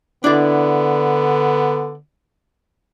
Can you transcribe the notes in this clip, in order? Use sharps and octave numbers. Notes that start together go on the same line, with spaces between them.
D3 B3 D4 E4 D5